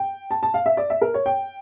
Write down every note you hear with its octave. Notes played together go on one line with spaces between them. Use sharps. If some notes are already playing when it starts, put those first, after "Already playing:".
Already playing: G5
A5
A5
F5
E5
D5
E5
A#4
C#5
G5